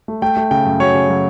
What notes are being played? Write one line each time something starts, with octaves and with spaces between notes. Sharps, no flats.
A3
A3 G5
A3
C#3 G5
F#2
F#3 C#5
C#3
F#3